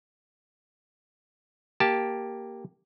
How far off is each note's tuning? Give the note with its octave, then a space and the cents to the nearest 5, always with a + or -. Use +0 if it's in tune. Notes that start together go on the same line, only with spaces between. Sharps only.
A#3 +0 G4 +0 A5 -5